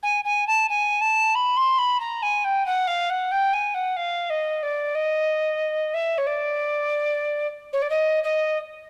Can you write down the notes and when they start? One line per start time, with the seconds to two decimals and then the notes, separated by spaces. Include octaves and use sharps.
0.03 G#5
0.24 G#5
0.47 A5
0.69 G#5
1.01 A5
1.35 B5
1.57 C6
1.78 B5
2.00 A#5
2.22 G#5
2.44 G5
2.66 F#5
2.87 F5
3.10 F#5
3.31 G5
3.53 G#5
3.74 F#5
3.96 F5
4.30 D#5
4.63 D5
4.95 D#5
5.94 E5
6.18 C#5
6.27 D5
7.73 C#5
7.82 D5
7.90 D#5
8.24 D#5